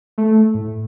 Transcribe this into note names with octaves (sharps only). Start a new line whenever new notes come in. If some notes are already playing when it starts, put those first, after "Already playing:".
A3
A2